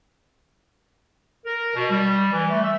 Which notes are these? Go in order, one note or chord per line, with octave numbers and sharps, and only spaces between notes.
A#4
B2
G3
E3
A3
E5